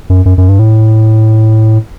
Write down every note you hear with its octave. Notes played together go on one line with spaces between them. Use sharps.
F#2
F#2
F#2
G2
A2